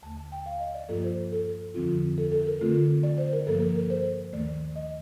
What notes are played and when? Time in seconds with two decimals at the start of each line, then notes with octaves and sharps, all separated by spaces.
0.03 D#2 D3 A3 A5
0.17 A5
0.32 G5
0.46 F5
0.60 D#5
0.74 D5
0.89 G2 F3 A#3 F4 A4
1.04 C5
1.32 A4
1.74 F2 D3 F3 C4 F4
2.18 A4
2.32 A4
2.47 A#4
2.61 D3 A3 C4 F4
3.03 D5
3.18 C5
3.33 A#4
3.47 G2 F3 A#3 A4
3.61 A#4
3.75 A#4
3.90 C5
4.32 D#2 D#3 A3 D5
4.76 D#5